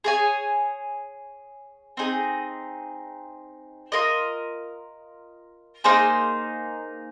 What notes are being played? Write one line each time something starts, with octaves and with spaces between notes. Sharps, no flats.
G#4 C#5 G#5
C4 D#4 G#4
F4 A#4 D#5
A#3 D#4 G#4 C5